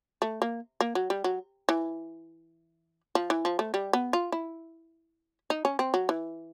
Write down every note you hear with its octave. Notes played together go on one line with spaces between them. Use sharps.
A3
A#3
A#3
F#3
G3
F#3
E3
F3
E3
F3
A3
G3
B3
F4
E4
D#4
C#4
C4
F#3
E3